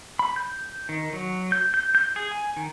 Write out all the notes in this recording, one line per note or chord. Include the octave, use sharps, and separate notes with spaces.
B5
G6
D#3
F#3
G6
G6
G6
G#4
G#5
D#3